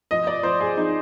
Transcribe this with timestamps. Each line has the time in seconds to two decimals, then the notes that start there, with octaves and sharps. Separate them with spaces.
0.11 F3 D#5
0.27 D5
0.43 F3 C5
0.60 G#4
0.77 F3 D#4